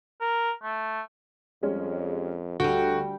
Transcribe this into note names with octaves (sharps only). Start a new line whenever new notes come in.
A#4
A3
F2 G3 G#3 C#4
D2 G3 F#4 A4 G5